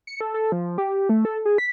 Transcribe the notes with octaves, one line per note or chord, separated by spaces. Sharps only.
C#7
A4
A4
F3
G4
A3
A4
G#4
B6